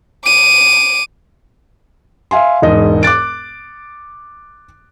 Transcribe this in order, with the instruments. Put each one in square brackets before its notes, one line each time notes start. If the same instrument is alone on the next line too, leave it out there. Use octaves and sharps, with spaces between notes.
[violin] D6 D#7
[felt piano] E5 F5 G#5 C6
E1 G#2 D#5
D6 F#6 A6 D7